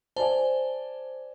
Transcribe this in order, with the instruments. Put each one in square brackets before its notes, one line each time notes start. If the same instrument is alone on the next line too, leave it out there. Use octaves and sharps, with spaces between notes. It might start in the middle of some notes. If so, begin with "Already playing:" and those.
[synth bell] C5 [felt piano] D5 G#5 A5